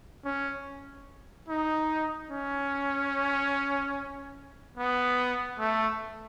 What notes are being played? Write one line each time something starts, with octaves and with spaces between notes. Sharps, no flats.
C#4
D#4
C#4
B3
A3